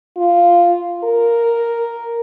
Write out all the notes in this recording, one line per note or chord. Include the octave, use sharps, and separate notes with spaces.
F4
A#4